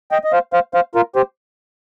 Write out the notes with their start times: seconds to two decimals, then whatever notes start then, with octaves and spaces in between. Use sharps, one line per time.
0.11 D#5 G5
0.24 D#5
0.32 C5 F5
0.53 C5 F5
0.74 C5 F5
0.95 F4 A#4
1.16 G4 C5